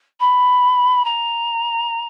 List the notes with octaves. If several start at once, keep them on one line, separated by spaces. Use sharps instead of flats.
B5
A#5